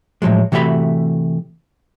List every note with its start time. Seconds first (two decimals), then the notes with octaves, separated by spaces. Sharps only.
0.22 A2 F3 F#3 G#3
0.52 C3 E3 A3 F#4 E5 B5